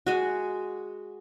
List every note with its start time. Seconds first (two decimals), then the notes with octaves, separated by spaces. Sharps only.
0.07 G#3 F#4